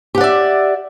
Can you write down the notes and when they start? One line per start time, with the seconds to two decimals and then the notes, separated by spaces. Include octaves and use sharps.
0.15 G4
0.18 F#5
0.21 D5
0.24 E5